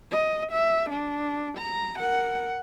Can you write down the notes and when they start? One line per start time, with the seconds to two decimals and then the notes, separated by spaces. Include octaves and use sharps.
0.11 D#5
0.52 E5
0.90 D4
1.58 A#5
1.97 A#4 F#5